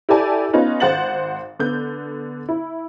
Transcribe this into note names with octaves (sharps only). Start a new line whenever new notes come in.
E4 G4 A4 D5 G#5 A5
B3 C#4 D#4 F4 B4
G#1 C5 F#5 A6 F#7
D3 B3 G6
E4